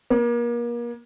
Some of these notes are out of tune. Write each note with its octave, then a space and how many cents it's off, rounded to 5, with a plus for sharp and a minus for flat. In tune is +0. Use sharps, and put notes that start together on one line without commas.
A#3 +35